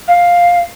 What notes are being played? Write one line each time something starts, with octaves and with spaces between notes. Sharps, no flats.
F5